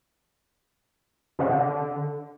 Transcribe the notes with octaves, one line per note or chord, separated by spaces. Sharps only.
C#3
C3
D3